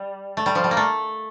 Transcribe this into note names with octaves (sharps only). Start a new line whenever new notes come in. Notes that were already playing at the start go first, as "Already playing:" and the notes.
Already playing: G3
A3
G3
F3
G3
A#3
A3